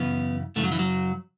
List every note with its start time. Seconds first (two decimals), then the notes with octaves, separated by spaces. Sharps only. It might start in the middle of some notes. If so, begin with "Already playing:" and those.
Already playing: F#2 C#3 E3 B3
0.56 F#2 C#3 E3 A3
0.64 F#3
0.72 E3
0.79 F#3